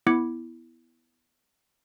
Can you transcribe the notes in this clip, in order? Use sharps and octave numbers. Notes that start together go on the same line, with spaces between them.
B3 E4 B5 D6 G#6 C#7